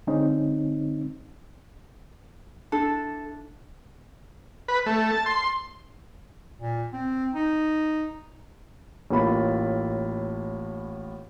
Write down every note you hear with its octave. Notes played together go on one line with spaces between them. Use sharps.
D3 G#3 C4 C#4 D#4
D4 E4 A4
B4
A3
A5
C6
A#2
C4
D#4
A1 A2 A#3 F4 B5